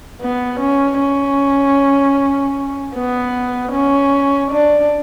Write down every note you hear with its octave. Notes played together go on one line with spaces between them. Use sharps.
B3
C#4
C#4
B3
C#4
D4